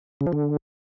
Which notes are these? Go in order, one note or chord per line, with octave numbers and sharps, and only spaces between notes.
C#3
F3
D3